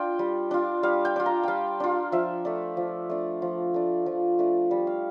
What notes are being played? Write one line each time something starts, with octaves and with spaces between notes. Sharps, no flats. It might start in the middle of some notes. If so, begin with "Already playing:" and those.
Already playing: D4 F4 G5
G3
D4 F4
G3 F5
G5
D4 F4
A#5
G3 F5 G5
D4 F4
F3 E5
A3 D4
F3
A3 D4
F3
A3 D4
F3
A3 D4
G3
F5